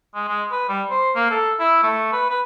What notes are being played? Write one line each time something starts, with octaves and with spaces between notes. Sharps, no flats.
G#3
G#3
B4
G3
C5
A#3
A4
E4
A3
B4
B4